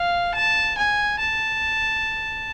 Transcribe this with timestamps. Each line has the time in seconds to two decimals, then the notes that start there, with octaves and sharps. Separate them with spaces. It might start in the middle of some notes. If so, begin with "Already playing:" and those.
Already playing: F5
0.35 A5
0.78 G#5
1.20 A5